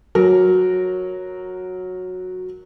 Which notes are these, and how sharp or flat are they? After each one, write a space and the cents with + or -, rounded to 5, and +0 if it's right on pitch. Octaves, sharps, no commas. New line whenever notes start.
F#3 -10 A#4 +0